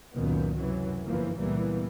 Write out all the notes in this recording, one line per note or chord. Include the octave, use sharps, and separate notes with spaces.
C#2 F#2 A#2 D#3 B3
F#2 C3 E3 F#3
G1 E3 F3 A#3
C#2 A#2 E3 G3 A#3 B3